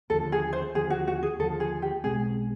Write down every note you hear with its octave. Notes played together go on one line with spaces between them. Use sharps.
D#2 D3 F3 A4
G#4
C5
D#2 D3 F3 G#4
F#4
F#4
G#4
D#2 D3 F3 A4
G#4
G4
B1 B2 G#3 C4 G#4